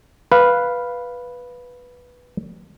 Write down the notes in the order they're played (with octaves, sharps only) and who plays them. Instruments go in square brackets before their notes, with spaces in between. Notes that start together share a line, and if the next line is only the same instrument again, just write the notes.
[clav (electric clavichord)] B4 F5